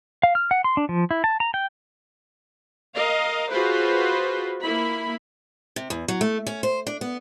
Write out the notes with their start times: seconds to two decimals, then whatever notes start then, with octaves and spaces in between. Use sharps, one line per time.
0.23 F5
0.35 F6
0.51 F#5
0.64 C6
0.77 D4
0.89 F3
1.11 E4
1.24 A5
1.40 A#5
1.54 G5
2.95 A#4 D#5 F5
3.51 F4 F#4 G#4 B4 C5
4.63 A#3 E4 B5
5.76 C3
5.90 E2
6.08 F#3
6.21 A3
6.47 C#4
6.63 C5
6.87 D4
7.01 B3